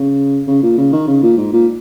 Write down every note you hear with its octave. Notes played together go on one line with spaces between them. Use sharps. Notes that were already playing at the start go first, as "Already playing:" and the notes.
Already playing: C#3
C#3
A#2
C#3
D#3
C#3
A#2
G#2
A#2